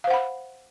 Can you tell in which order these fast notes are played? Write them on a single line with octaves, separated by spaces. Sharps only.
F5 C5 F#5 B5